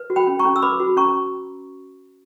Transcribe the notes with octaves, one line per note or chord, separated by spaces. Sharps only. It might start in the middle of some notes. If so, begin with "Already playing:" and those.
Already playing: B4
F#4
G5 B5
C#4
A#5 C#6
C#4
E6
B4 B5 D6
F#4
C#4 A#5 C#6